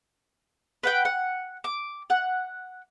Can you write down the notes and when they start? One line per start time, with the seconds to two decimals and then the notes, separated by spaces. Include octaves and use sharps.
0.83 B4 F#5 G5
1.05 F#5
1.64 D6
2.10 F#5